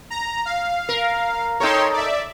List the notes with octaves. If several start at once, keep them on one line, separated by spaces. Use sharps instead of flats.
A#5
F5
A#4
D#4 A4 A#4 C#5 G5 C6
D5 E5